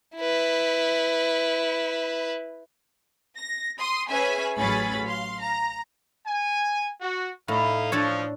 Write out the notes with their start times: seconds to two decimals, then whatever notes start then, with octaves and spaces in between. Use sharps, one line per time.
0.16 E4 B4
3.37 A#6
3.77 C6 D#6
4.09 C#4 G#4 B4 E5 G#5
4.58 A1 F#3 C#4 G#4 B5 A6
5.06 F5 C6
5.41 A#5
6.26 G#5
7.01 F#4
7.48 A2 D#4 E4 F5
7.92 F3 D4 A4 C#5